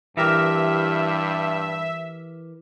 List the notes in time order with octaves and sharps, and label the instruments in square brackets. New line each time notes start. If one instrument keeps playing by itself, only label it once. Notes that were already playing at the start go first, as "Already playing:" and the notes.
[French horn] G2 [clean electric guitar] E3 G4 A#4 [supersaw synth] E5